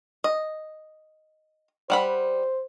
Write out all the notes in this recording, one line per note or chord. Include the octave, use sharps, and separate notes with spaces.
D#5
G3 C5 F#5 B5